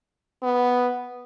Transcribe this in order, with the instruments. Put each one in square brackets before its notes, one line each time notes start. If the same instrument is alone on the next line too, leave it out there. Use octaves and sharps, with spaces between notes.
[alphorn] B3